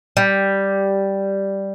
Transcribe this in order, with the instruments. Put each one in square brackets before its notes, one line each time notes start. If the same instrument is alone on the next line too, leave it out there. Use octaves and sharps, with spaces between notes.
[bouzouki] G3